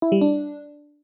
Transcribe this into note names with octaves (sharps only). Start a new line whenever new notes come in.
E4
G3
D4